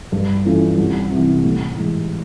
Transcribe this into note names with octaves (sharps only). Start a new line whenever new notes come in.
G2
E3 A3 C#4 F4
C2
C3 E3
A2
E3 G#3